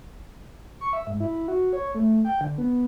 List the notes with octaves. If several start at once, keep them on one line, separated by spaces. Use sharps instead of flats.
C#6
E5
G#2
E4
F#4
C#5
A3
G5
D3
B3